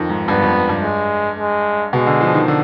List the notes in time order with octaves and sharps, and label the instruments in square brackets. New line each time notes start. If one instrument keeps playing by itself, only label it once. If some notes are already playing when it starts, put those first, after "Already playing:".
Already playing: [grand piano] F2 D#3
G#2
[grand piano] G2 [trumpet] B3
[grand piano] F2
G2
[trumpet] G#3
G#3
[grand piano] B2 [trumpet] G#3
[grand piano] D3
F3
D#3
D3